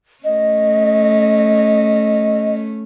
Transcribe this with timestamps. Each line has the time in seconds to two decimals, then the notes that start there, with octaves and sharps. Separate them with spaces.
0.24 A3 C#4 D#5